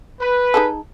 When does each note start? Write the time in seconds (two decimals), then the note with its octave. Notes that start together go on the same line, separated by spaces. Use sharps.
0.20 B4
0.54 D#4 G#4 A4